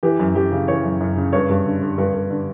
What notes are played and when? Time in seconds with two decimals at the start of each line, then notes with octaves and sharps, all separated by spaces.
0.03 E3 G4
0.19 F#2
0.35 F#2 G4
0.52 C#3
0.68 E3 C#5
0.84 F#2
1.00 F#2
1.16 C#3
1.33 G2 C#5
1.50 G2
1.66 D3
1.82 D3
1.98 G2
2.14 G2
2.31 D3